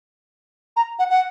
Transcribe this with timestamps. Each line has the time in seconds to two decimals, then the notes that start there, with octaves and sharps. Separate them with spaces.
0.77 A#5
0.99 F#5
1.10 F#5